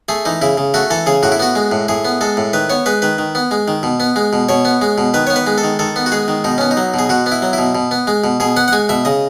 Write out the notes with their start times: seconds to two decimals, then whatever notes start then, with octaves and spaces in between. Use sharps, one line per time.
0.09 A3 G#4
0.25 E3 D#4
0.42 C#3 E4
0.58 C#3
0.74 A3 F#4
0.90 E3 A4
1.06 C#3 G#4
1.23 A2 F#4
1.32 E4
1.39 B3 F#4
1.55 G#3
1.72 A2
1.88 A2 G#4
2.05 B3
2.21 G#3 A4
2.37 A2
2.53 D#3 B4
2.70 B3 C#5
2.86 G#3 B4
3.02 D#3 B4
3.18 D#3
3.35 B3
3.51 G#3
3.68 D#3
3.83 B2
4.00 B3
4.16 G#3
4.33 B2
4.49 B2 C#5
4.65 B3
4.82 G#3
4.98 B2
5.14 D#3 B4
5.27 B3 C#5
5.36 B4
5.47 G#3
5.58 A4
5.64 D#3
5.79 D#3 A4
5.96 B3
6.06 F#4
6.12 G#3 G#4
6.28 D#3
6.44 B2 D#4
6.58 B3 C#4
6.71 D#4
6.77 F#3
6.94 B2 G#4
7.09 B2 F#4
7.26 B3
7.32 E4
7.42 F#3
7.53 E4
7.58 B2
7.75 B2
7.91 B3
8.07 G#3
8.24 B2
8.40 B2 G#4
8.57 B3 F#5
8.68 F#5
8.72 G#3 G#5
8.89 B2 E5
9.05 C#3 D#5